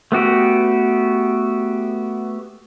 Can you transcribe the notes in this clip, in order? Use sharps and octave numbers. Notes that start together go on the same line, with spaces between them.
A3 B3 F#4 G4